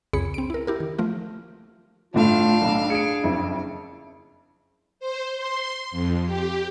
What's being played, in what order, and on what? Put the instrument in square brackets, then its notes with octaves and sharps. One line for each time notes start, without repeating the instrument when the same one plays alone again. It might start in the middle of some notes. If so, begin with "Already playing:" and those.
[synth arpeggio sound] C2 F2 C#3 G#4 B5 C#7
C4 D7
E4 A#4
E4 G4 A#4
D#3
F3 A3 F4
[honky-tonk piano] G1 A2 A3 [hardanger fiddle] D4 F5 [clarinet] F4
[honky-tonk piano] B1 A2
[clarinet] G#4 [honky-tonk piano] C#7 D7
[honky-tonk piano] F#1 F2 E4
[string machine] C5
C6
F2
G4